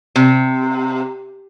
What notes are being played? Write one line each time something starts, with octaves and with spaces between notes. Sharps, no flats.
C3